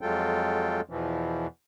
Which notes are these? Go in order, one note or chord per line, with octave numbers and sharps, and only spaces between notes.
F2 F#3 G#3 F4 A4 G5
E2 B2 E3 F3